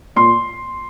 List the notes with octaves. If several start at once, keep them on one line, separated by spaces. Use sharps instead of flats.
A#2 C6